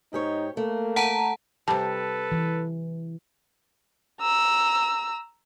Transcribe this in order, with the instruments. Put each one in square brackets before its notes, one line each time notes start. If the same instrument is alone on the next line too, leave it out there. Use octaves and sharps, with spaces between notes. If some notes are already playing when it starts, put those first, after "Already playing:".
[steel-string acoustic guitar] G#2 G4 C#5 [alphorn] D#4
[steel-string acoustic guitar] A3 [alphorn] A#3
[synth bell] F#5 A5 A#5
[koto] C3 G3 [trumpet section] A4 B4 [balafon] A5
[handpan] E3
[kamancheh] A#5 E6